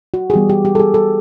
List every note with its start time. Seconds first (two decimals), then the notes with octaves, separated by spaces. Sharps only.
0.14 F#4
0.30 G#4
0.34 E3 G3 B3 G4
0.50 G4
0.65 G4
0.75 A4
0.80 G#4
0.94 A4